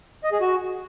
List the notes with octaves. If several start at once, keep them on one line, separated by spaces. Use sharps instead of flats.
D#5
G#4
F#4